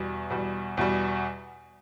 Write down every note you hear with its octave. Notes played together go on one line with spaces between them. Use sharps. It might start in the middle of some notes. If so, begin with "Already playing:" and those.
Already playing: E2 B2 G3
E2 B2 G3
E2 B2 G3